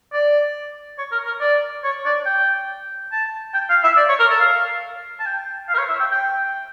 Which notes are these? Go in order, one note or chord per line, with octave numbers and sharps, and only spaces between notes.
D5
C#5
A#4
A#4
D5
C#5
D5
G5
A5
G5
F5
E5
D5
C#5
A#4
A4
F5
A5
G5
F5
A#4
C#5
E5
G5
G5